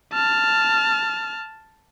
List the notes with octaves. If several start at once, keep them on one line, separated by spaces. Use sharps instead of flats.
A5 F6